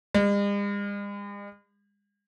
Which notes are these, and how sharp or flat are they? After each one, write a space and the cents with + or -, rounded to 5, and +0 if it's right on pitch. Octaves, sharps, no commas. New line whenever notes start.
G#3 -45